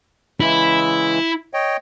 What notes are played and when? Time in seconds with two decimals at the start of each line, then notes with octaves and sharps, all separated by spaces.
0.41 C#3 E3 G#3 E4
1.54 C#5 D#5 G5